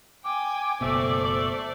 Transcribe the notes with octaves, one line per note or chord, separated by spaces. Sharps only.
G5 G#5 D6
F#1 B2 A3 C5 D5